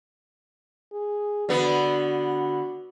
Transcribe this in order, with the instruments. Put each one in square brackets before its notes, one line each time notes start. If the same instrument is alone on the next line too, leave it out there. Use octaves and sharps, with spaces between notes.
[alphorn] G#4
[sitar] D3 B3 [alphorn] F#4